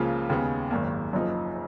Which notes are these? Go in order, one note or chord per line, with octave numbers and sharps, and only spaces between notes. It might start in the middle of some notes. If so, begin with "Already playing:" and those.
Already playing: C#2 C#3 F3 A#3 F4
D#2 C#3 G#3 B3
G#1 F#2 D#3 A#3
F#1 F#2 F3 A#3 D#4